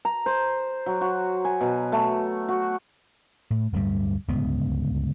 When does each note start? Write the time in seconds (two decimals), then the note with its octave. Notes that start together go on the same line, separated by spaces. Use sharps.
0.05 A#5
0.26 C5
0.86 F#3
1.01 F#4
1.45 G#5
1.61 B2
1.92 A3
2.49 F#4
3.50 A2
3.72 D1 D2 G2 G3
4.28 D1 C#2 G2 B3